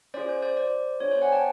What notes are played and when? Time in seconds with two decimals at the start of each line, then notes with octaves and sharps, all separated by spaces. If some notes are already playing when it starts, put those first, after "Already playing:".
0.14 C#4 F4 G#4 C5 D5
0.29 C5
0.42 C5 D5
0.57 C5 D5
1.00 B3 D4 F4 G#4 C#5
1.11 C5 D5
1.22 F#5 G#5
1.32 G5 A5